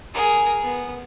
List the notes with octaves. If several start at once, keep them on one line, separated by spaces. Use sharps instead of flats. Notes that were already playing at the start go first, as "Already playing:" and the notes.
G#4 A#4
B3